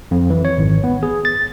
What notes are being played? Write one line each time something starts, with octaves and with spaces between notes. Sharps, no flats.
F2
E3
C#5
G#1
B3
G#4
A6